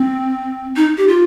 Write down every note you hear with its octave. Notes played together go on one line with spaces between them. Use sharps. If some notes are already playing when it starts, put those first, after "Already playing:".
Already playing: C4
D#4
G4
F4